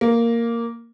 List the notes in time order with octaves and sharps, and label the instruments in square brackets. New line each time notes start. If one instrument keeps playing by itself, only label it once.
[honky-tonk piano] A#3